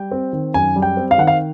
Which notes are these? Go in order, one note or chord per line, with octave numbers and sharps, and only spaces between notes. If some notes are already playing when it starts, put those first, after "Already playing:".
Already playing: G3 G5
C4
D#3
F#2 G#5
G3
G5
C4
F5
D#3 F#5
F5